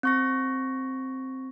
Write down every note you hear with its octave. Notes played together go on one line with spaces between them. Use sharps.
C4 C#6 A#6